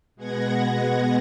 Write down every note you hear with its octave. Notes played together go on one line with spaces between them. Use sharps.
B2 G#3 B3 F#5 G#6 A#6